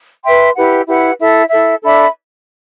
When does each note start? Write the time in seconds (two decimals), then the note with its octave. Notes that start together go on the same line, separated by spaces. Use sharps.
0.25 B4 E5 G5 C6
0.56 E4 G4 B4 F#5
0.87 E4 G4 B4 F#5
1.19 E4 A4 E5
1.50 E4 A4 E5
1.82 D4 A4 E5 B5